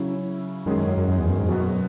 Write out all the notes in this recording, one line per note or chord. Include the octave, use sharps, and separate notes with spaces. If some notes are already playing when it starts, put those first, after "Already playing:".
Already playing: C#3 F#3 C#4 E4
F#2 D#3 G#3 C#4 G#4
F#2
F#2
F#2
F#2
E2
F#2
G#2
F#2 B2 F#3 B3 F#4
F#2